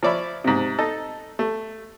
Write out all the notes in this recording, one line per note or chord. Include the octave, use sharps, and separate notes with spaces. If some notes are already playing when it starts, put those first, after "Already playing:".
F3 C#5 D5 E5 B5
G#2 C3
D#4 A4
A3